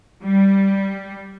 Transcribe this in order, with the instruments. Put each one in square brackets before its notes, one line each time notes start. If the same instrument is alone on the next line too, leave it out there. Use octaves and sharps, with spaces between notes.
[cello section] G3